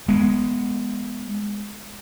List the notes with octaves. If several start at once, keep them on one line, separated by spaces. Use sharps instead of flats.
G#3 B3